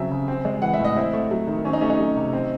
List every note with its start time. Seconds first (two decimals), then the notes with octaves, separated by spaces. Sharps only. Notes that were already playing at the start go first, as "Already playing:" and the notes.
Already playing: C#3 F#3 C4 E5
0.11 C#3
0.28 C4
0.45 G#3
0.62 E3 F#5
0.74 E5
0.79 A2
0.84 D#5
0.96 C4 E4
1.13 A3
1.31 F#3
1.47 D#3
1.65 C4 C#4
1.73 D#4
1.81 A3 C#4
1.90 D#4
1.99 F#3
2.16 C3
2.33 C4